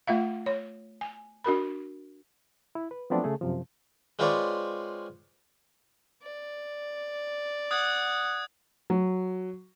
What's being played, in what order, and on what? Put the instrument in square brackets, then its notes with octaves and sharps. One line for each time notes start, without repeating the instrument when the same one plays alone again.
[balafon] A3 F4 E5 F5
C#5
G#5
D4 F#4 A#4 B5
[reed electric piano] E4
B4
F3 F#3 A3 B3 C4 D4
C#3 A3 G#4
F#2 C3 F3
[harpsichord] G#3 C4 F4 B4 C#5 D5
[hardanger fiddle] D5
[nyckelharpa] F#5 [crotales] D#6 F#6 G#6
[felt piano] F#3